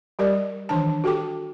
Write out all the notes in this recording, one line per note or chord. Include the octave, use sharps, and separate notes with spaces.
G3 G4 A#4 D5
D#3 E3 D4 A5
F#4 G4 A4 G5 D6